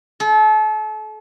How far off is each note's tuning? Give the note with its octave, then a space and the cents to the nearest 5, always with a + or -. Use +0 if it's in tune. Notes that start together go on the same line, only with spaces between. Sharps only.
A4 -35